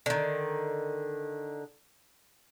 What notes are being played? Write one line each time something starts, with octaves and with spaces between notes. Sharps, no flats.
D3 D#3